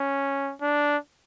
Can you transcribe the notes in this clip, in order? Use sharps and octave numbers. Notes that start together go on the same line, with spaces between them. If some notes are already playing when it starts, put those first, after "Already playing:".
Already playing: C#4
D4